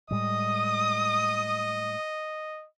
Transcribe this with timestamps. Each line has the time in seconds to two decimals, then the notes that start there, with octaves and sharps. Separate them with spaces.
0.11 A2 G3 G#3 D#5 D#6